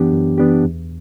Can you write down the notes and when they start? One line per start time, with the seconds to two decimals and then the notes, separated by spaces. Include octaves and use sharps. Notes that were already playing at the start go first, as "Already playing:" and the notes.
Already playing: F#2 E3 B3 D4 G4
0.12 F#2
0.38 E3 B3 D4 G4
0.64 E2